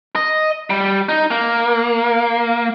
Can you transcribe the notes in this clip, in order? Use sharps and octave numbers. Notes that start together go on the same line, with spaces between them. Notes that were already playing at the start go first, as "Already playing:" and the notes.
D#5
G3
D#4
A#3